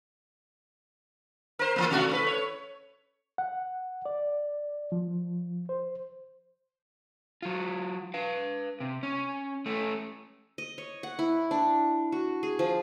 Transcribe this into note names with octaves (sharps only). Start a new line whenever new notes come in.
A#4 C5
E3 F#3 A#3
C3 A3 F#4
A2 F4 B4
C#5
F#5
D5
F3
C5
F#3 F4
B4 F5
C3
C#4
A3 C#4
D#5
C#5
F#5
E4
D4
F#4
G#4
F3